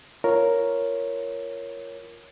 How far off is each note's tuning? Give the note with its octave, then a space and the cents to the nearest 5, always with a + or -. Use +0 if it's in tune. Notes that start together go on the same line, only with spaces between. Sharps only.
F4 -10 A#4 +0 C#5 +0